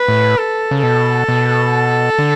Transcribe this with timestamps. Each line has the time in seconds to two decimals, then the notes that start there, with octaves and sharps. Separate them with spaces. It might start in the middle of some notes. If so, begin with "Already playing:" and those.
Already playing: B4
0.08 A2
0.38 A4
0.71 C#3
0.83 B2 A4
1.29 B2
2.19 D3